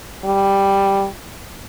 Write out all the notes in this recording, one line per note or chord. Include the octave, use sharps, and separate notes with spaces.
G3